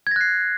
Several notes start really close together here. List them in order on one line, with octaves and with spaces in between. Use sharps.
G#6 A#6 F#6 C7